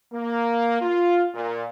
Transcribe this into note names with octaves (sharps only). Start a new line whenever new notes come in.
A#3
F4
A#2